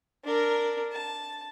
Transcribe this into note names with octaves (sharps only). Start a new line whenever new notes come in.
D4 A#4
A5